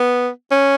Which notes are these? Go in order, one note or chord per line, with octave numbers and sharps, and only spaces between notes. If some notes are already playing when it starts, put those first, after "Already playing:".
Already playing: B3
C#4